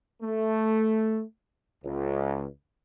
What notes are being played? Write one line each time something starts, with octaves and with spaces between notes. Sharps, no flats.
A3
C#2